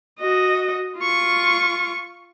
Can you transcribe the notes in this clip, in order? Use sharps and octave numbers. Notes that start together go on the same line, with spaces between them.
F#4 D#5
F4 C#6